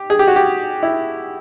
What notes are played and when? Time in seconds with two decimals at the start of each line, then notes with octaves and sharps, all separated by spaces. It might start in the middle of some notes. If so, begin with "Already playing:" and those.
Already playing: G4
0.10 G#4
0.19 G4
0.27 F#4
0.36 G4
0.83 E4